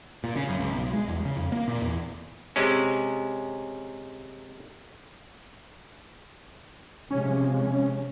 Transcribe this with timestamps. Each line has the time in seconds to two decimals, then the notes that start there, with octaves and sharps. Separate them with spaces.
0.24 A#2
0.36 C#3
0.49 F#2
0.60 C#2
0.72 B1
0.94 G#3
1.08 E2
1.25 C#3
1.37 F2
1.52 A#3
1.68 A#2
1.82 E2
2.56 C3 G#3 C#4
7.11 C3 F3 G#3 C#4